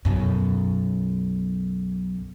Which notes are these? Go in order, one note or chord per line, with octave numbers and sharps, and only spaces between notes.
B1 F#2